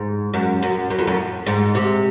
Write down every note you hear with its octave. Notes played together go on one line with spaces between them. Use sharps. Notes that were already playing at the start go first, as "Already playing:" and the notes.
Already playing: G#2
F#2
F#2
F#2
F2
F#2
G#2
C3